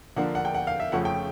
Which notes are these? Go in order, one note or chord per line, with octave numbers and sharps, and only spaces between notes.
D3 F3 A#3 D4 F#5
F#5
G5
F#5
F5
E5
F2 C#3 F3 A3 C#4 F#5
G5